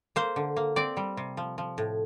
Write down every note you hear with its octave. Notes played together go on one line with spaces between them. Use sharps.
A#3 C5
D3
A#3
C4 D5
G3
C3
F3
F3
A2